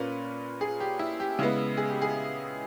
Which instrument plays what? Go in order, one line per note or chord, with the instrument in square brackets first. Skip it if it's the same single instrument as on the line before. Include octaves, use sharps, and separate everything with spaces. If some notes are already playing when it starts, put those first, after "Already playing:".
Already playing: [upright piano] A#2 A#3 C#4 B4
G#4
G4
E4
G4
C#3 G#3 B3 E4
G#4
G4
G#4